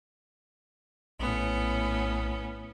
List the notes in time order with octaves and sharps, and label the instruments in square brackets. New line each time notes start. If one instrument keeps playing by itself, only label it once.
[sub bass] A#1 [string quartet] A2 B3 C#4